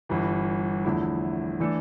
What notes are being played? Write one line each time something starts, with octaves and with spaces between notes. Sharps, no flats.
G1 G2 E3
E2 D3 F3 A3 E4
E3 A3 D4 A4